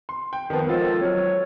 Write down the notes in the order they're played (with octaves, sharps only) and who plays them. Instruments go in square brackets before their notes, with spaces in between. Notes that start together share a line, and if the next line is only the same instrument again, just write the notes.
[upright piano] C6
G5
[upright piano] D#3 B3 [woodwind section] F3
[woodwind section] D#3 G#3 A4 [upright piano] F3 F4 C5
[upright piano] F#3 F6 [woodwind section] C#5